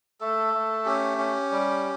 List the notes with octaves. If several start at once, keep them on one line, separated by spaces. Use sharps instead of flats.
A3 A4
A3
C#4 G4
C#4
G3